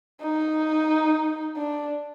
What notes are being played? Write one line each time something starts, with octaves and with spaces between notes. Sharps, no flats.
D#4
D4